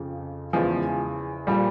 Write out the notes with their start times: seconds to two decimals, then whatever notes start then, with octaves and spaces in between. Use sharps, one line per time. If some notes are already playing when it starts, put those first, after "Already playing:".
Already playing: F2 C#3 F3
0.53 E2 C#3 E3 F3 G#3
1.47 A#2 F3 G3